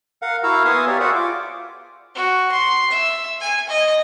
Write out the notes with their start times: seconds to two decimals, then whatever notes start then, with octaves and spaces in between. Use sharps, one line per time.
0.22 A#4 F5 F#5
0.43 E4 F#4 A#4 F5 A#5 E6
0.65 B3 E5 F5 G#5 C6 D#6
0.87 G4 A#4 C#5 D5
1.00 F#4 G#4 C5 D5 E5 F#5
1.15 F4 D6
2.15 F#4
2.52 C6
2.90 E5
3.41 G#5
3.69 D#5